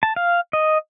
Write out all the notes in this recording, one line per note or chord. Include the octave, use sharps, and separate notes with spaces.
A5
F5
D#5